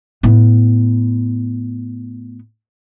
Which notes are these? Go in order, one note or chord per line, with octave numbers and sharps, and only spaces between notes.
A2 B3